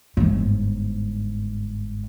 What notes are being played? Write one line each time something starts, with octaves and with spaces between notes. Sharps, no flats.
G1 G#2